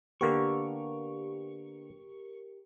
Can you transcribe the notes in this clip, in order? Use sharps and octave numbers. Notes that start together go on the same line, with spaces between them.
D3 A#3 B3 G4 A#4 C#6